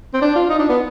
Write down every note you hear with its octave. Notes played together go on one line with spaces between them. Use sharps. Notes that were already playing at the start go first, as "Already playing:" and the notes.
C4
D4
F4
D#4
D4
B3